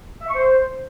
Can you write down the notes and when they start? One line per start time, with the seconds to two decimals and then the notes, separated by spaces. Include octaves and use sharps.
0.21 E5
0.28 C#6
0.35 C5